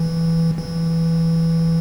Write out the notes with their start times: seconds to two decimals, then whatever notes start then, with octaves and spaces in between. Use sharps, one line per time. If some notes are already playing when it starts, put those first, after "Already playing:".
Already playing: E3
0.58 E3